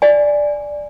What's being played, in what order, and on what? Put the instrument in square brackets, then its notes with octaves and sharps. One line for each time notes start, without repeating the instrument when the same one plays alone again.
[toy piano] D5 G#5